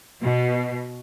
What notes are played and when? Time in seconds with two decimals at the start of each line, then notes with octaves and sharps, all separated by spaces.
0.23 B2